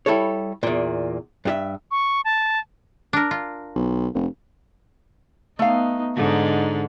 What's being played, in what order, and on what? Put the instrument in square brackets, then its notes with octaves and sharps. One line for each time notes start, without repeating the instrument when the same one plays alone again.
[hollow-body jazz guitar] G3 E4 A4 C#5
E2 A#2
G2 G4 E5
[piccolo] C#6
A5
[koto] D4 A#4
F4
[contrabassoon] B1
F1
[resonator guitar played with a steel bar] A3 F5 [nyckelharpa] B3 D#4
[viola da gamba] G#2 D3 [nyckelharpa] D#4